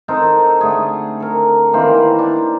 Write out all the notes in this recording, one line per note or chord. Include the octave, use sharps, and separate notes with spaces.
C4 D#4 A4 A#4
D3 A3 G#4
A4 A#4
D#3 E3 A#3 C4
D4